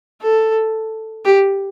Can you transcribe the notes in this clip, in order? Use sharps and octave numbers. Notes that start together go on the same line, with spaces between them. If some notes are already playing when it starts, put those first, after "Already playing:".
A4
G4